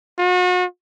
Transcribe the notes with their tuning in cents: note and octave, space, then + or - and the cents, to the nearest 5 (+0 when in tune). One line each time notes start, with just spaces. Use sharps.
F#4 -40